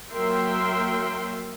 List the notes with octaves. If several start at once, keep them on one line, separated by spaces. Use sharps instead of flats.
F#3 A#3 A#4 E5 G5 C6